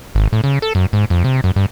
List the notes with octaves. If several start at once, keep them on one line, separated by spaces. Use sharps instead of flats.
G#1
A2
C#3
A4
F#2
G#2
F2
C3
F#2
G2